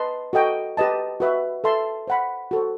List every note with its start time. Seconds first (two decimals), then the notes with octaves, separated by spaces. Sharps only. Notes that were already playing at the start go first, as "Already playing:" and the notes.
Already playing: B4 D#5 A5 C6
0.33 F#4 A4 D#5 G5
0.77 G4 B4 D#5 A5
1.20 F#4 B4 E5
1.64 A4 E5 A5 C6
2.07 C5 F#5 B5
2.51 F#4 A4 C5